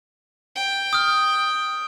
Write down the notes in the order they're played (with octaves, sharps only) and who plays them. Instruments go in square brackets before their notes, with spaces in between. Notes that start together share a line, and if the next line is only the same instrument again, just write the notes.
[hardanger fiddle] G5
[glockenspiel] D#6 F6